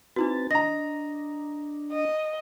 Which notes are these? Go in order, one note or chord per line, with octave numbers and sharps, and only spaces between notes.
C4 D#4 E4 F#4 B4 A6
D4 D#5 A#5 A#6
D#5